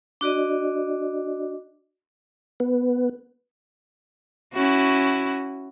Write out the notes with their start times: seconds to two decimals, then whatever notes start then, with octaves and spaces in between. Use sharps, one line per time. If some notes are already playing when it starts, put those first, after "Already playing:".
0.21 D4 F#4 D5 D#5
2.60 B3
4.54 C#4 E4 F#4